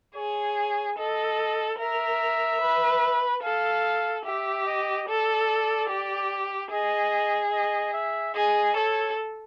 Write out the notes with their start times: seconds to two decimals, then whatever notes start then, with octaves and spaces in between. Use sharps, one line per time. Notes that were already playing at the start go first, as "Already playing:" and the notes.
0.16 G#4 C#5
0.98 A4 D#5
1.79 A#4 E5
2.61 B4
3.43 A4 F5
4.25 G4 E5
4.66 D#5
5.08 A4 D5
5.89 G4
6.71 G#4 D#5
7.53 D#5
7.94 E5
8.35 G#4 D#5
8.76 A4 C#5